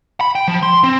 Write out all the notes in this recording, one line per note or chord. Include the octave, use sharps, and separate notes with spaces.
B5
G5
F3
C6
C4